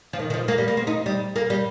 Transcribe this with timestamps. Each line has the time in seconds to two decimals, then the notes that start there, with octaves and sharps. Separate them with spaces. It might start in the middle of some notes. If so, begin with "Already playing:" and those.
0.13 F3
0.19 D#3
0.30 D#3
0.34 F3
0.48 A#3
0.58 G3
0.68 A#3
0.77 C4
0.87 D#4
1.06 G3
1.36 A#3
1.50 G3